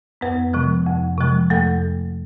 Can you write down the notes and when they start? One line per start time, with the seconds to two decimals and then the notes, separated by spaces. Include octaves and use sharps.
0.21 F2 B3 B4
0.53 C3 F3 G#3
0.87 F2
1.18 C3 F3 G#3
1.50 F2 A3 A4